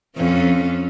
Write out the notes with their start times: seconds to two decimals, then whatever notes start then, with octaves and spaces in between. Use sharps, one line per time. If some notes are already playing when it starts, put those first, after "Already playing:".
0.16 F2 F3 C#4